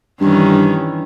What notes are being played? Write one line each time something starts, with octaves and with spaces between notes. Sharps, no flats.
G2 D#3 E3 C#4